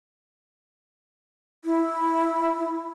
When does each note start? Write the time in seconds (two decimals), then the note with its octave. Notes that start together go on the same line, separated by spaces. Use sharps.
1.65 E4